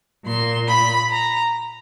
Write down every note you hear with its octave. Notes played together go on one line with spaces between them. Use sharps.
A#2 C6
B5
A#5